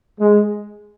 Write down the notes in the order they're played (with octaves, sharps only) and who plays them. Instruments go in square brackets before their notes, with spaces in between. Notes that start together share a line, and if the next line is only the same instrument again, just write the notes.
[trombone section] G#3